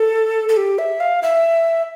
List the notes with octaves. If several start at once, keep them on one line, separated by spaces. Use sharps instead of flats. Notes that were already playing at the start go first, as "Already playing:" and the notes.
Already playing: A4
A4
G4
E5
F5
E5